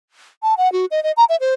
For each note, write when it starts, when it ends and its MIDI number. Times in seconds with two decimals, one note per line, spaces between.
0.43 0.54 81
0.57 0.71 78
0.72 0.86 66
0.91 1.02 75
1.03 1.12 75
1.17 1.24 82
1.29 1.36 76
1.40 1.54 72